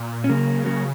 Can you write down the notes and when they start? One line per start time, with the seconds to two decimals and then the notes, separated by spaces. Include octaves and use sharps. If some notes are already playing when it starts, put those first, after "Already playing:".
Already playing: A#2
0.24 C#4
0.29 C#3 F#3 A#3
0.66 F#3 A#3